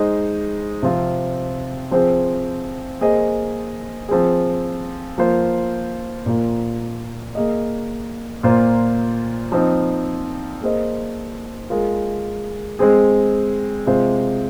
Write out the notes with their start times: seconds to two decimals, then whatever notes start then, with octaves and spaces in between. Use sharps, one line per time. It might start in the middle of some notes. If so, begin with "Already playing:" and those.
Already playing: G#3 D#4 C5 D#5
0.82 C3 F3 C4 F4
1.91 F3 C4 G#4 C5
3.01 A#3 G#4 C5 D#5
4.08 F3 C4 G#4
5.18 F3 A#3 F4 C5
6.26 A#2 A#3 F4
7.35 A#3 G#4 D#5
8.43 A#2 A#3 F4 C5
9.52 F3 C4 D#4
10.61 A#3 G#4 C5 D#5
11.70 G#3 F4 A#4
12.79 G#3 C4 G#4
13.87 C3 G#3 F4 C5